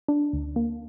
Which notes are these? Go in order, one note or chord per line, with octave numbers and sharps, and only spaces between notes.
D4
D2
A#3